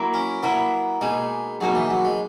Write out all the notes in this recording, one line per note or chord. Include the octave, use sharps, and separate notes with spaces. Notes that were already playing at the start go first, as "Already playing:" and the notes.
Already playing: F#3 A#3 E4 A#4
C#4
F#3 A#3 B3 E4 A#4
B2 G#3 A#3 D#4 G#4
B2 F#3 A#3 D#4 G#4
E3
F#3
G#3